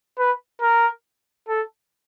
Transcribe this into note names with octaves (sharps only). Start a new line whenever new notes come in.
B4
A#4
A4